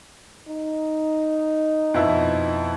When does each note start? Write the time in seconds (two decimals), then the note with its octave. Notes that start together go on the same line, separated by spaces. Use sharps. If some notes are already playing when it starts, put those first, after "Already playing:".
0.48 D#4
1.94 F2 B2 E4